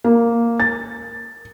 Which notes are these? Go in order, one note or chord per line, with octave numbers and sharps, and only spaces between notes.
A#3
A6